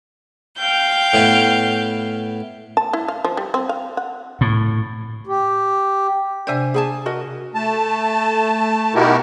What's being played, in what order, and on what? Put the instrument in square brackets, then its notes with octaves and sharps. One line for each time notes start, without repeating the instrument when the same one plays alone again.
[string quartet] F5 G5 G6
[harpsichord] A2 B3 B4
[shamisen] A5
E4
F5
F3
G3
C4
F5
F#5
[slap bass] A2
[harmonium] G4
[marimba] C3 D4 D5 [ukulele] C5 E5 G#5
[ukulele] G#4 G#5 A5
F#4 A#4 D#5
[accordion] A3 A5
B2 D#4 E4 F#4 G4 A#4